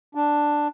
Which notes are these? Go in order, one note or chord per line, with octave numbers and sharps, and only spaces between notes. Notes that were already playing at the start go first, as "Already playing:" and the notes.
D4